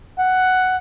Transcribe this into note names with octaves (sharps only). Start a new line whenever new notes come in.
F#5